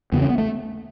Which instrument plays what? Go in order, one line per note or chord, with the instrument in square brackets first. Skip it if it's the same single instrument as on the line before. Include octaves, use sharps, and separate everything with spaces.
[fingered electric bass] E2 C#3 B3
C#4
B3
A3